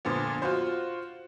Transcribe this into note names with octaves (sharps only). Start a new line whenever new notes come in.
A#2 D3 F3 B3
F4 F#4 C5